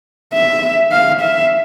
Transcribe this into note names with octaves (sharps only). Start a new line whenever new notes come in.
E5
F5
E5